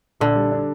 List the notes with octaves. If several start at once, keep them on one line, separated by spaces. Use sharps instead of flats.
A#1 D3
G3
D4